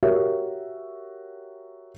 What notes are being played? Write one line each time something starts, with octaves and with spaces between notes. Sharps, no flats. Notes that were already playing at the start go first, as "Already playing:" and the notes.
F#4 G4 A#4 C#5 E5